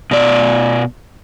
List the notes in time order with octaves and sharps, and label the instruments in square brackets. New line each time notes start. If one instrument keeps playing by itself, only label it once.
[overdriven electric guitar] B2 D5